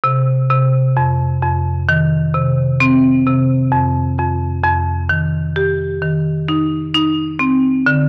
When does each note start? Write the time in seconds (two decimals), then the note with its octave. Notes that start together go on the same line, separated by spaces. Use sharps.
0.04 C3
0.50 C3
0.97 F2
1.43 F2
1.89 D#3
2.34 C3
2.80 C4
3.26 C3
3.72 F2
4.18 F2
4.64 F2
5.09 D#3
5.56 G4
6.02 D#3
6.48 D#4
6.94 D#4
7.39 C4
7.86 D3